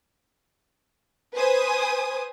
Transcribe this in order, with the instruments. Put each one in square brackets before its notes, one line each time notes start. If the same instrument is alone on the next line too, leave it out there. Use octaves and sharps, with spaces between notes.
[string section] B4 C5 G#5 D#6